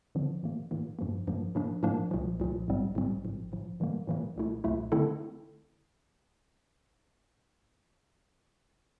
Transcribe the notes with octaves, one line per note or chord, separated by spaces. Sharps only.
D3 F3 C4
A2 E3 A#3
A2 E3 A#3
G2 F3 A#3
G2 F3 A#3
A2 F3 A#3 D4
A2 F3 A#3 D4
C2 A#2 F3
C2 A#2 F3
A#1 A2 G3 C4
A#1 A2 G3 C4
A1 A2 F3
A1 A2 F3
A2 E3 G3 A#3
A2 E3 G3 A#3
C2 A#2 A3 E4
C2 A#2 A3 E4
D3 A3 C4 E4 A4